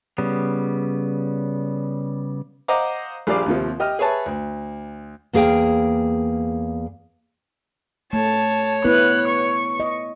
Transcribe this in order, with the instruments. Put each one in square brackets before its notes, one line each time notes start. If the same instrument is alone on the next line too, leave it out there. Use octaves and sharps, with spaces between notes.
[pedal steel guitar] C#3 G3 B3
[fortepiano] C5 D#5 F5 F#5 A#5 D6
A#1 G3 G#4 D5 F5 D6
D#2 C3 F3
G4 D#5 F6
G#4 B4 C#5 E5 A5
D2
[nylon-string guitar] E2 A#3 G#4 F5 G5
[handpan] A3 [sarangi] C#5 [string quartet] A5
[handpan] B3 E4 B4 [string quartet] F#6
[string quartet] C#6
[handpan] D#5